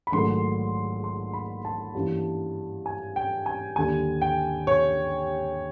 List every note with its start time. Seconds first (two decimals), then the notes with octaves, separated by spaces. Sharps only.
0.07 B5
0.12 A#1 G#2 D#3 F#3 A3 C6
1.04 C6
1.33 B5
1.65 A5
1.95 G2 E3 G3 A#3 C#4
2.86 G#5
3.16 G5
3.46 G#5
3.76 D#2 D3 G3 G#5
4.21 G5
4.67 C#5